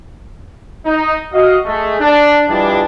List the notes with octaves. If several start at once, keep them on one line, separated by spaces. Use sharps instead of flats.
D#4
F#4 D#5 F5
G#3 A3
D4
E3 F3 G3 G#3 D4